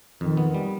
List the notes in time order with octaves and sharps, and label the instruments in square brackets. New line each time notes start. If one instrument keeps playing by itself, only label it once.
[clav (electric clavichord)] F2 [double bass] D#3
[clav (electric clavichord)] B3
G3